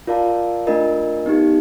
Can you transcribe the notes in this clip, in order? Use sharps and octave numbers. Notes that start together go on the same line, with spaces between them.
F4 A#4 D5 F5 A5
A3 D4 F4 A#4 D#5
B3 D#4 G4